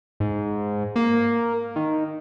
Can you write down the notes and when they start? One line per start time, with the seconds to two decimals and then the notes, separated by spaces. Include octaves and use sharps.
0.20 G#2
0.96 A#3
1.76 D#3